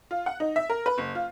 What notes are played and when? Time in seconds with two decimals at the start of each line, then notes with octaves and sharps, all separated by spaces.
0.11 F4
0.26 F#5
0.40 D#4
0.56 E5
0.70 A#4
0.86 B4
0.98 F#1
1.15 F4